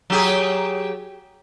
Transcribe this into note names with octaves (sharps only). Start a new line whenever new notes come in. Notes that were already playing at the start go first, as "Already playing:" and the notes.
F#3 G4 G#4